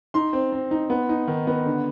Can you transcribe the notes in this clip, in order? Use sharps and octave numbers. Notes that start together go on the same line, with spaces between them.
D#4 C6
C4
C4
D#4
B3
D#4
D#3
B3
D3